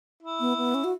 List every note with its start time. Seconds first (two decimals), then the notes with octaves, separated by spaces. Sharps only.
0.23 E4
0.40 B3
0.57 B3
0.74 C#4
0.84 F#4